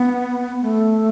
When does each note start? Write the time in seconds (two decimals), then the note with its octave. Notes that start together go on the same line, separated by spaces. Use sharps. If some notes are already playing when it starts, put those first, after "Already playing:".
Already playing: B3
0.62 A3